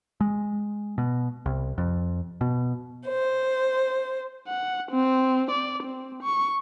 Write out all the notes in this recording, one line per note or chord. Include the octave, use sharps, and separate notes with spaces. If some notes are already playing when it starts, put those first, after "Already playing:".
G#3
B2
C2
F2
B2
C5
F#5
C4
D5
C4
C#6